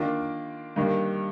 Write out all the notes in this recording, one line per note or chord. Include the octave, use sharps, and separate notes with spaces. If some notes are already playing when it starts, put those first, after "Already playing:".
Already playing: D#3 A#3 D4 F4
G2 D#3 A#3